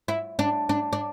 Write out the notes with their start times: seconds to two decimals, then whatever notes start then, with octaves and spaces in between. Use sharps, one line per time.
0.08 E4
0.39 D4
0.69 D4
0.93 D4